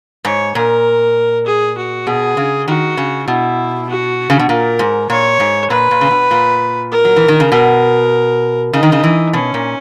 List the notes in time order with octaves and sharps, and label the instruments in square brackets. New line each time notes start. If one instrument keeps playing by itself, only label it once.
[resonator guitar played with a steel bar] G#2 [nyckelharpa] C#5
[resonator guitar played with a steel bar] A#2 [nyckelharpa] A#4
[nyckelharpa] G#4
F#4
[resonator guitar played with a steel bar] B2 [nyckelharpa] G#4
[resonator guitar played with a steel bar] C#3
[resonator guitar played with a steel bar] D#3 [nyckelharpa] F#4
[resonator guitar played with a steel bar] C#3
[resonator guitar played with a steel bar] B2 [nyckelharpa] E4
[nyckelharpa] F#4
[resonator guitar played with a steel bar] C#3
B2
[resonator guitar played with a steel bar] A#2 [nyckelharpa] A#4
[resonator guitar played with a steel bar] G#2
[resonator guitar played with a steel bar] A#2 [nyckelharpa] C#5
[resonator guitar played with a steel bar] G#2
[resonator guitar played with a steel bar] A#2 [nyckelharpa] B4
[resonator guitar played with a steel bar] A#2
C#3
B2
A#2
[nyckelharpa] A#4
[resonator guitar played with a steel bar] F#3
E3
D#3
C#3
[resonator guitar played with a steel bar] B2 [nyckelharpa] A#4
[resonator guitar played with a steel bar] C#3 [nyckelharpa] D#4
[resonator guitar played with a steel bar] D#3
C#3
E3
[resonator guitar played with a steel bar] B2 [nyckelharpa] C#4
[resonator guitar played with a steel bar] A#2